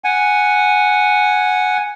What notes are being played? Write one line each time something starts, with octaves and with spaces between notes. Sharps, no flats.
F#5 G#5